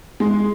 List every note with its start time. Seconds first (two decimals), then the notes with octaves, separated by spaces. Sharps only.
0.20 G#3